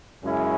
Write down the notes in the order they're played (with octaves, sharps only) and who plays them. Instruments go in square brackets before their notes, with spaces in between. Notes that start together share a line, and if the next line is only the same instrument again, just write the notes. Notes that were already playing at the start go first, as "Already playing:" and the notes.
[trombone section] F#2 C#3 G#3 C#4 E4